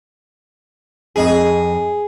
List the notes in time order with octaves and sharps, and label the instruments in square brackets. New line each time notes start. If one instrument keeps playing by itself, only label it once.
[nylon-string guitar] F2 D#5 G#5 [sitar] G#4